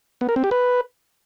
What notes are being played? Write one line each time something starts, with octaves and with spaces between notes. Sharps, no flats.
B3
A#4
C4
G4
B4